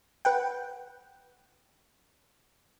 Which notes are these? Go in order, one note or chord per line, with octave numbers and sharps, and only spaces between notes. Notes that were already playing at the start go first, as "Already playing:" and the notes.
B4 F#5 G5